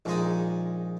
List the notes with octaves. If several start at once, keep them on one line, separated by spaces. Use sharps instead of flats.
A#1 A#2 G#3 D#4